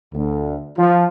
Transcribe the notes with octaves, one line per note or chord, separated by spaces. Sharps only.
D2
F3